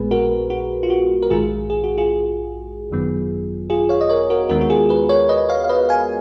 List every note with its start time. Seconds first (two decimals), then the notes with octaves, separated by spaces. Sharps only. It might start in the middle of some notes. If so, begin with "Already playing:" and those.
Already playing: A#1 A#2 G#3 B3 G#4 B4
0.11 F#4 A#4
0.50 F#4
0.83 F4
0.90 F#4
1.22 A#4
1.30 A#1 G#2 D#3 G#3 F4 G#4
1.70 G#4
1.84 F#4
1.98 F4 G#4
2.90 G#1 F#2 D#3 F#3 B3
3.70 F4 G#4
3.89 C#5 F5
4.01 D#5
4.09 A#4 C#5
4.30 F#4 A#4
4.49 D#2 D#3 G#3 B3 F#4 A#4
4.61 F#4
4.70 F4 G#4
4.89 G#4 B4
5.09 A#4 C#5
5.29 B4 D#5
5.49 C#5 F5
5.64 F5
5.69 B4 D#5
5.89 F5 G#5